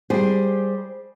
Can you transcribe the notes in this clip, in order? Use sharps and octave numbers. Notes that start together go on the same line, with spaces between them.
G3 G4 G#4 C5